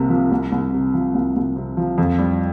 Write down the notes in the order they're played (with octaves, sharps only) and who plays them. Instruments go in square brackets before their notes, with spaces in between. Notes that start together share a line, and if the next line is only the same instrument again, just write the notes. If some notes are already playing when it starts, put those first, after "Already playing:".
Already playing: [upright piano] C2 C3 A#3
F3
C2
C2
C3
F3
C2
C2
C3
F3
F2
G3